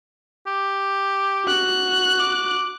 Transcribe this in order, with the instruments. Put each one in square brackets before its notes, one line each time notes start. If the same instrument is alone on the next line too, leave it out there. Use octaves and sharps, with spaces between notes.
[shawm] G4
[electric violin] F#4 F#6
[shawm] D6